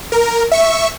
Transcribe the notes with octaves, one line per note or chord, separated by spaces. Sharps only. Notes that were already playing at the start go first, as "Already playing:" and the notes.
A#4
E5 C#6